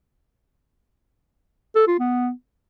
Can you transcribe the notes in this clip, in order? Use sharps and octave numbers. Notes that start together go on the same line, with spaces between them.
A4
F4
B3